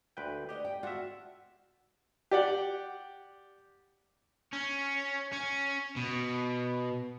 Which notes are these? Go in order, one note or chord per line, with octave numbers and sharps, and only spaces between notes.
D2 B4 G5
F#4 G4 D5 D#5
G5
D4 F4 F#4 E5
G4 D5 F#5
C#4
C#4
B2